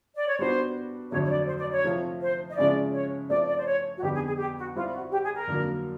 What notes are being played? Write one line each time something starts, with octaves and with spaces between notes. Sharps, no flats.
D5
C#5
G3 B3 D4 F#4 C5
F2 D3 F#3 A3 C#5
C#5
D5
C5
D5
C#5
C3 F3 A3 C4 F4
C5
D#5
C#3 F3 G#3 C#4 E4 D5
C#5
F3 A3 C4 D5
D5
C5
C#5
F#4
F2 D3 G3 B3 D#4 G4
G#4
G#4
G4
F#4
G3 C4 E4 F4
F#4
G4
G#4
A#4
F2 D3 F#3 A#3